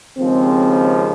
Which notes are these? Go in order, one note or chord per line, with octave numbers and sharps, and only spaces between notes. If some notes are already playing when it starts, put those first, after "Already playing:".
D#2 C#3 F3 G#3 C4